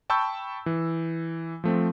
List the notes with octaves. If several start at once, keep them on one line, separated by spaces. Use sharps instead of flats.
G5 A5 B5 C#6 E6 G6
E3
F3 A3 C4